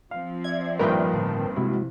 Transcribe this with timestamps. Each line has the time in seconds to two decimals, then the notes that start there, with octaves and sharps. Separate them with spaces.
0.11 F3 C4 F5
0.44 D5 E5 G#6
0.79 A#1 G2 D#3 A#4 B4 G5
1.14 A2 D3 A5
1.56 C3 G#3 E4 F#4